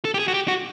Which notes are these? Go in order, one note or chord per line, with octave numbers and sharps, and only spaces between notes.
A4
G4
G#4
F#4
G4
F#4